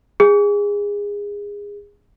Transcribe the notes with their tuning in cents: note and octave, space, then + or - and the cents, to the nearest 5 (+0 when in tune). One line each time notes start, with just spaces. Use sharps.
G#4 -25